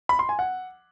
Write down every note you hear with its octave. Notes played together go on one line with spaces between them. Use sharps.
B5
C6
G#5
F#5